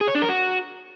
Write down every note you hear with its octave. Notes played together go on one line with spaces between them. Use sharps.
G#4
C#5
D4
A#4
F#4